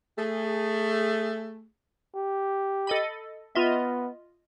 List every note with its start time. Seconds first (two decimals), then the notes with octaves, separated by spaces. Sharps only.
0.18 A3 G#4
2.15 G4
2.87 A4 D#5 B5
3.55 B3 F4 D#5 E5